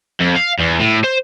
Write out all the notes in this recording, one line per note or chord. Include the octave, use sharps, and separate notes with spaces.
F2
F5
E2
A2
C5